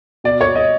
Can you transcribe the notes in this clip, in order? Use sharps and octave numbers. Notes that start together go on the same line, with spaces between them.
B2 D5
C#5
D#5